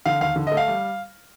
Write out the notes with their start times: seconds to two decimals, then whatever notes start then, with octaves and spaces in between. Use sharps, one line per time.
0.05 D3 F5
0.21 D#2 F5
0.36 D3
0.47 D#5
0.52 A3
0.57 F5
0.68 G3